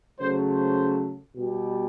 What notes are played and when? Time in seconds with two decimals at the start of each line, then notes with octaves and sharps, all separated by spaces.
0.19 C#3 F#3 A3 C5
0.48 C5
1.35 B2 G3